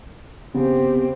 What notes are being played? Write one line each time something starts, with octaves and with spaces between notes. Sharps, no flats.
C#3 B3 C4 G4